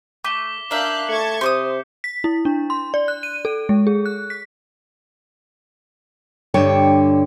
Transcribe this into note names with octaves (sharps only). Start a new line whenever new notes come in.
A3 D6 B6 G7
D4 A#4 E5 F5 F#6 G6
A3 A5 C#6 G#6 C#7
C3 C5 C6 D6 D#6 G6
B6
E4
D4
C6
D5
F#6
D#7
A4
G#3
G#4
F#6
B6
G2 D3 C#5 G5